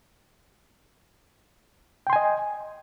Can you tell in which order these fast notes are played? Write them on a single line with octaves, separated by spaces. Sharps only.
G5 C6 G#5 D#5